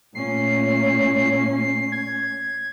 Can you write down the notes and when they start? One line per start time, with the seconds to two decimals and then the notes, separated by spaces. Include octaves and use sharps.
0.15 A#2 A3 C#4 C7
1.92 G#6